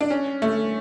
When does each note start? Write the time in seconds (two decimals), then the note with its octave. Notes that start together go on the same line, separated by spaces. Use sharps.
0.01 D4
0.10 C#4
0.42 A3